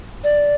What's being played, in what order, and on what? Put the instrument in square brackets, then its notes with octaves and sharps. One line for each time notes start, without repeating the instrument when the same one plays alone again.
[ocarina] D5